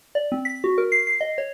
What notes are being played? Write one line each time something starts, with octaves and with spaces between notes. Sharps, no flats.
D5
C4
B6
F#4
A#4
C7
C7
D#5
C#5